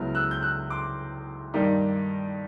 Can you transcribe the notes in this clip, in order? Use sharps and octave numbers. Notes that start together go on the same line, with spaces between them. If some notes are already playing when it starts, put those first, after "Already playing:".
Already playing: C#2 C#3 F#3 B3 E4 F6
E6 F#6
G6
E6 F#6
C6 D6
G2 D#3 G3 A#3 D#4